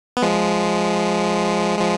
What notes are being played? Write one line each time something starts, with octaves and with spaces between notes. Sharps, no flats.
B3
F3 G#3
F3 G#3